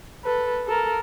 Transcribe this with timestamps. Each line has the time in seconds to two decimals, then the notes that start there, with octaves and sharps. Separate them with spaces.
0.24 A4 B4
0.67 A4 A#4